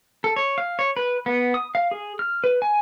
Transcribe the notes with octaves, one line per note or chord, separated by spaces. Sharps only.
A4
C#5
F5
C#5
B4
B3
D#6
F5
G#4
F6
B4
G#5